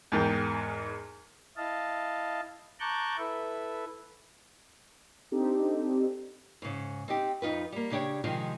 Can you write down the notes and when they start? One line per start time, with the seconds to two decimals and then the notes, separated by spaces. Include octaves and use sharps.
0.12 E2 G#2 A#4 G5
1.57 E4 D#5 F5 A5
2.80 A5 A#5 C#6 D6 F#6 G6
3.18 E4 A4 B4 E5
5.31 C4 D4 D#4 G4 A4
6.62 G#2 C#3
7.08 C4 D#4 G4
7.42 F2 D#4 F4 B4
7.72 G3 A#3
7.91 C#3 D4 G4 C#5
8.24 C3 D#3 F3 G#3 F4